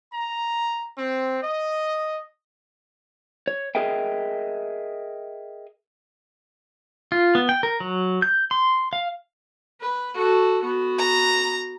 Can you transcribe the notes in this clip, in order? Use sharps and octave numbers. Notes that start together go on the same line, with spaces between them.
A#5
C4
D#5
C#5
G#4 A#4 D#5 E5 G5
F4
B3
G5
A#4
F#3
G6
C6
F5
B4
F#4 A4
B3 F#4
A#5